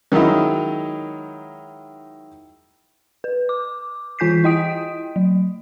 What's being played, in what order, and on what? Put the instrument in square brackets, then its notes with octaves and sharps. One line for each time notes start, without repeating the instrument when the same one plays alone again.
[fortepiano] D#3 F#3 G#3 D#4 E4
[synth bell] B4
D6
E3 F4 G#5 G6 B6 C7
E4 D#5 G5 D#6 D7
F#3